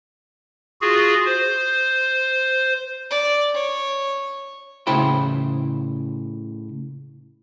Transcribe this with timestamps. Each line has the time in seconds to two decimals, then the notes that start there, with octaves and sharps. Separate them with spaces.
0.82 F4 F#4 G#4
1.26 C5
3.10 D5
3.54 C#5
4.87 A2 C#3 E4 C5 G5 B5